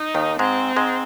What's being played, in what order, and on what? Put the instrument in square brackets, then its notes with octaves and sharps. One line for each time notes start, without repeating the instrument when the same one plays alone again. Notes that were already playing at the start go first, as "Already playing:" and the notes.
Already playing: [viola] D#4
[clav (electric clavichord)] D#2 D#3
[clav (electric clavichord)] G#2 G#3 [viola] C4
[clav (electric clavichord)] G#2 G#3